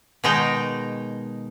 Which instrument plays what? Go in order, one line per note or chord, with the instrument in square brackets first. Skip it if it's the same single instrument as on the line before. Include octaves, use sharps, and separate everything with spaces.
[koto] B2 D#3 G#3 D#4 G5 A#5